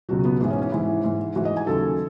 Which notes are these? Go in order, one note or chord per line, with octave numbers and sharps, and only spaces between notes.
C#2 B2 F#3 F#4
B3
G#2 E3 B3
C#4
C#4
G#2 E3 E4
G#2 E3
G#2 E3 F#4
D#5
G#5
D#2 C#3 F#3 A4